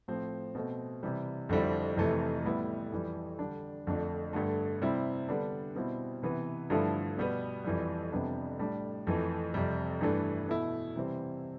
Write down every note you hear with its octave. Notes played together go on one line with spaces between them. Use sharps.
A2 F3 C4
B2 A3 C4
C3 E3 G3
F2 D3 G3 C4 E4
F2 C3 E3 A3
A2 G3 B3 E4
F2 E3 G3
D3 G3 D4
F2 D3 A3 D4
G2 D3 A3
C3 G3 C4 E4
D3 G3 B3 D4
B2 G3 C4 E4
C3 E3 B3
G2 D3 F3 A3 E4
B2 G3 B3
F2 E3 G3
F2 C3 G3 B3 D4
A2 G3 D4
F2 E3 A3
F2 C3 G3
G2 E3 A3 D4
B2 A3 E4
C3 E3 G3 C4